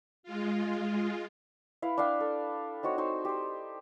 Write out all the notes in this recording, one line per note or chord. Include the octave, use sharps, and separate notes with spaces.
G#3 F4
E4 B4 F5
D4 E5 F5 G5
A4
C4 D#4 F#4 C#5
D#4 F#4 C5 G5
G4 C5